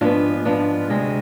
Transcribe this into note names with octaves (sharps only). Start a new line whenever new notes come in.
G#2 F3 B3 D4 F4
G#2 F3 B3 D4 F4
D2 C3 G#3